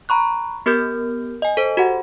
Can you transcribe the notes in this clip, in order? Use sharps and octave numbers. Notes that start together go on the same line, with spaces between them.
A#5 B5 C#6 F#6
B3 G4 A#4 F6 G6
D#5 G#5
A4 C5
F#4 G4 F#5